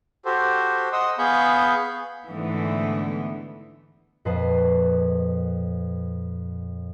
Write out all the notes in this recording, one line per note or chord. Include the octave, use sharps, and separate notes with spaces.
F#4 G4 A4 C5
D#5 F#5 C6 D#6 E6
B3 G#4 F5 B5 C#6 G6
G#2 D3 E3 A3 B3
F2 A#2 B4 D#5 A5 C7